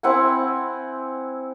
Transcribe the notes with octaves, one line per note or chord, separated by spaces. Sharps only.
C4 E4 F#5 G#5